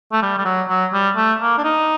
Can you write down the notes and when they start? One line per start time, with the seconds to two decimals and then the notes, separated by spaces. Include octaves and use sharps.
0.12 A3
0.22 G3
0.38 G3
0.45 F#3
0.69 F#3
0.93 G3
1.17 A3
1.41 A#3
1.58 D4
1.64 D#4